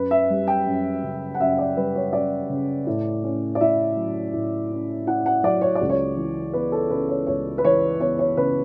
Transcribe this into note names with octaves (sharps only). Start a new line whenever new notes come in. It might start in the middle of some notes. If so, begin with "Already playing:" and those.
Already playing: F#2 B4
E5
G3
G5
F#2
C#3
F#5
F#2 E5
D5
G3 B4
C#5
F#2 D5
C#3
A2
C#4
D5
E4 E5
F#3
A2
C#4
E4 F#5
F#5
F#3 D5
C#5
D5
C#2
C#5
E3
B3 B4
A4
C#3 B4
C#5
C#2 C#5
B4
E3 C#5
B3 C#5
C#5
C#3 B4